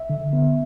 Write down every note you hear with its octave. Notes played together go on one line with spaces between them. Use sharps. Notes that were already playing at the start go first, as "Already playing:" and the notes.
Already playing: E5
D3
B3